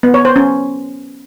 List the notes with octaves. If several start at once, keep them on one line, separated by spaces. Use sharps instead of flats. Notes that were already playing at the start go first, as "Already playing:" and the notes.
B3
C#5
C5
C#4